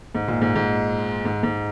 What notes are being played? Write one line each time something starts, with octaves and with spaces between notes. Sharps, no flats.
G#2
A#2
G#2
G#2
G#2
G#2